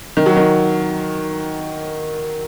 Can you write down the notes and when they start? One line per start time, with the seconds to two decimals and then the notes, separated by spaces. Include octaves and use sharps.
0.17 D#3
0.26 F#3
0.37 D#3